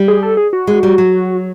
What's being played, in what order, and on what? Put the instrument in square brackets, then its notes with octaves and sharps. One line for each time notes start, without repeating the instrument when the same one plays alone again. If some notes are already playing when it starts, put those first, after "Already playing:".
Already playing: [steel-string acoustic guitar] G3
[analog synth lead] G#4
A4
G#4
F#4
[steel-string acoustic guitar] G#3
G3
F#3